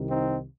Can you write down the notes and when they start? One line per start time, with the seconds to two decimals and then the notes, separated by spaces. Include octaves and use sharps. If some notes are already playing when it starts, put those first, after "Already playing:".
Already playing: C2 C3 D#3
0.10 C4 D#4